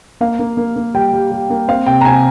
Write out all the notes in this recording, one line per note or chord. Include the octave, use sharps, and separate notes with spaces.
A#3 F5
A#3
A#3
A#3
G3 G5
G3
G3
A#3
C4 F5
C3 G5
A#5
C3 G#5